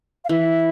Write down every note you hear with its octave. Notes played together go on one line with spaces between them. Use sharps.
F5
E3 E5